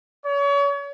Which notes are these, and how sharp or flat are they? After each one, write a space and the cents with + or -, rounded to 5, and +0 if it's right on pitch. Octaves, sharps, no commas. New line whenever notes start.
C#5 +35